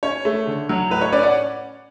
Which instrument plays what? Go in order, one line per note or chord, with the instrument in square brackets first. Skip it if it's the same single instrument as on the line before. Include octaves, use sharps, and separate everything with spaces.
[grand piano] C#4 C#5
A3
D3
F#3
A2 B4
C#5
C#4 B4 D5
D5 F#5